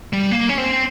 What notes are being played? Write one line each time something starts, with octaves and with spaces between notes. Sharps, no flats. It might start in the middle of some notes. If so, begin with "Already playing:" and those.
G3
A#3
C#4
C4